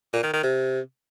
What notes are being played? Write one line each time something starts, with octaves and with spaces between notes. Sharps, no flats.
A#2
D#3
D#3
C3